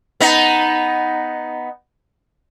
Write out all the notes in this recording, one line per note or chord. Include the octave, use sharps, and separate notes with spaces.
B3 D#4